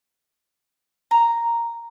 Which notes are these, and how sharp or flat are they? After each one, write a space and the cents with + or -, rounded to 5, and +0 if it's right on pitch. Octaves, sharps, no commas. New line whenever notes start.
A#5 +0